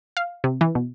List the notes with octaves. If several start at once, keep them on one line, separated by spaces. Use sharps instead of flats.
F5
C3
E3
B2